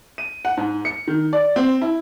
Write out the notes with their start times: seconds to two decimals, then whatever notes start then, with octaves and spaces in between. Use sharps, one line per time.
0.18 D#7
0.45 F#5
0.57 G#2
0.85 C#7
1.07 D#3
1.33 D5
1.56 C4
1.82 E4